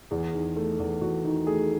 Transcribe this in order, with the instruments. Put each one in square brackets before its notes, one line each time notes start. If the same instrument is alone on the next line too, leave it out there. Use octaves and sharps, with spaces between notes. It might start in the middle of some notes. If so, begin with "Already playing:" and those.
[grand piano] E2 G#4
D#3
A3
E2
E2 F#4
D#3
A3 G#4